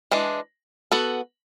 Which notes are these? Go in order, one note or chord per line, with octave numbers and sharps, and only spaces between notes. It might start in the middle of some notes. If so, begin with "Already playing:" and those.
E3 G#3 D4
B3 F#4 A4